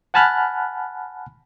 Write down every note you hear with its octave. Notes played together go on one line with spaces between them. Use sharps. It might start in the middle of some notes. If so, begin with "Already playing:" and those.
F#5 G#5 A5 B5 F6 F#6